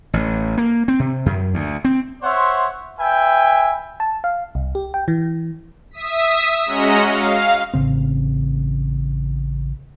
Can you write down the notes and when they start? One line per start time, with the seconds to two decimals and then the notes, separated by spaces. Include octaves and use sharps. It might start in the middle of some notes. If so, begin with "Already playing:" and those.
0.13 A1
0.58 A#3
0.88 C4
1.00 C3
1.26 F#2
1.54 D2
1.85 C4
2.23 C5 C#5 E5 F#5 C6
3.00 B4 E5 G5 G#5
4.00 A5
4.24 F5
4.55 C2
4.75 G4
4.94 G5
5.08 E3
5.91 E5 D#6 B6
6.66 G#3 C#4 F#4 D#5 A#5 C#7
7.06 F5
7.74 A1 C#3 C4